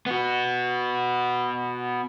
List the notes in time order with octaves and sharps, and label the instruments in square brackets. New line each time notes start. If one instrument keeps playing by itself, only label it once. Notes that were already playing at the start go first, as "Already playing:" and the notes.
[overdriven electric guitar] B3 F#4